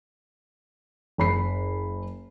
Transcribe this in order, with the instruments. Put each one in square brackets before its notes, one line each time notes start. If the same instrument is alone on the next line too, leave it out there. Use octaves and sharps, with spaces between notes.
[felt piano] F#1 B5 C7